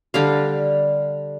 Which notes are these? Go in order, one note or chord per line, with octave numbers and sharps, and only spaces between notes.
D3 G3 F5